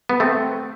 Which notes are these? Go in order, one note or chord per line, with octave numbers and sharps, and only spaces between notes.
B3
A3 C4